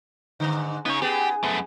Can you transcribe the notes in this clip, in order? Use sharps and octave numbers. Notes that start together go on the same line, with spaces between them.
G#2 D3
C#3 B3 D#4 C#5
B3 G4 G#4
F#2 A3 B3